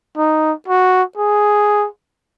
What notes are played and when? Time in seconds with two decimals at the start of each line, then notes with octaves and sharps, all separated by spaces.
0.18 D#4
0.68 F#4
1.18 G#4